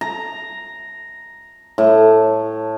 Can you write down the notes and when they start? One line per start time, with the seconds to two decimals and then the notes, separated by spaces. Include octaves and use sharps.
0.01 A#5
1.78 A2